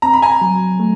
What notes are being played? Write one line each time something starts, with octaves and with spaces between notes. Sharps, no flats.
C4 A#5
B5
G#5 A#5
F#3
A3